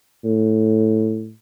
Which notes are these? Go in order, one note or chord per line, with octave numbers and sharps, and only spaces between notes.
A2